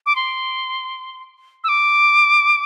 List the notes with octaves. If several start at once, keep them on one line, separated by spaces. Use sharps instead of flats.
D6
C6
E6
D6